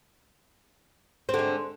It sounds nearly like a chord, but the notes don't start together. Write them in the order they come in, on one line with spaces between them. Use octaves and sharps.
C4 D3 G#3